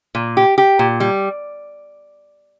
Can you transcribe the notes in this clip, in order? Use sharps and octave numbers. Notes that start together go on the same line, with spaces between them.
A#2
G4
G4
A#2
G3